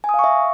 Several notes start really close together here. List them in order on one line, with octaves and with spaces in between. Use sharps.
G#5 D#6 F5 C#6 E5